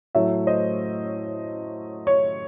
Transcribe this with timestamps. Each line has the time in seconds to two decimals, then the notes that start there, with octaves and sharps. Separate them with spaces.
0.15 A2 F#3 A3 C#5 E5
0.47 C5 D#5
2.07 C#5